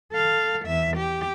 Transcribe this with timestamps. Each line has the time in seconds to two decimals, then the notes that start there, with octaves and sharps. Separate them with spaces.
0.13 A4 F5
0.66 E2 E5
0.97 G4